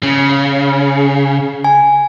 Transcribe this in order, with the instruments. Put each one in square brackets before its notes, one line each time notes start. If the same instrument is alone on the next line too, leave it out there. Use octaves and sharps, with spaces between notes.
[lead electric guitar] C#3
[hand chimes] G#5